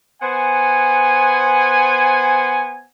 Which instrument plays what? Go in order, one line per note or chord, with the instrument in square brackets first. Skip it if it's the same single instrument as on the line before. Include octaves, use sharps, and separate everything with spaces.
[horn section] B3 C5 F#5 G#5